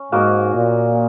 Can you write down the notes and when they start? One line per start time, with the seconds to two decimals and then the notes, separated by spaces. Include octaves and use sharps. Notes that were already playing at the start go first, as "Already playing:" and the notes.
Already playing: C#4
0.12 G#2 A#3 F#4 A#4 D#5
0.54 A#2